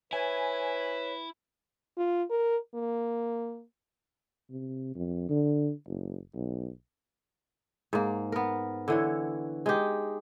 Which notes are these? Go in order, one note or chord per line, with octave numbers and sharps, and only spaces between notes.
E4 B4 C#5 G#5
F4
A#4
A#3
C3
F2
D3
F#1
B1
G#2 A#3
B3 A#4
D3 E3 C#5
G#3 D#4 G4